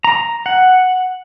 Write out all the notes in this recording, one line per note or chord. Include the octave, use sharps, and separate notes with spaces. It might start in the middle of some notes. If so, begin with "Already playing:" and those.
A#5
F#5